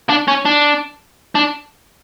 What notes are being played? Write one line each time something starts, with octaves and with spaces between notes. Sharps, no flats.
D4
C#4
D4
D4